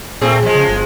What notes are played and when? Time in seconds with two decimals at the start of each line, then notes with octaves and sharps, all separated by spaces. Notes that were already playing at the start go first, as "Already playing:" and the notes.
0.21 A#2 A3 C4 G#4
0.42 F3 G#3
0.55 C#3
0.69 G1